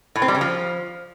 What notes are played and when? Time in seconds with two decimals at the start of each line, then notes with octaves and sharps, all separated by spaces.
0.16 A2
0.22 C4
0.28 G3
0.35 C#3
0.41 F3